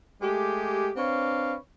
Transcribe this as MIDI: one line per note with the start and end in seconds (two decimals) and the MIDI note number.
0.22 0.90 56
0.22 0.90 57
0.22 0.90 67
0.96 1.56 60
0.96 1.56 62
0.96 1.56 71
0.96 1.56 73
0.96 1.56 77